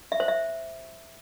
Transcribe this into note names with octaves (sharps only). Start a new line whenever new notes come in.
E5
C5
E5